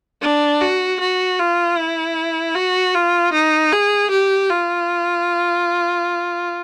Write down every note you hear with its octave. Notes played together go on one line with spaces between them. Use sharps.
D4
F#4
F#4
F4
E4
F#4
F4
D#4
G#4
G4
F4